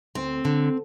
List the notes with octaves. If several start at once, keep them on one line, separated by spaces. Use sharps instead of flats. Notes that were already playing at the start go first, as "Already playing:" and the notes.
D2 C4
D3